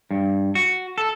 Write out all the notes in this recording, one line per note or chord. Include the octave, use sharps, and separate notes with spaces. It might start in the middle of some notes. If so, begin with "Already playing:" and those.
G2
F#4
A4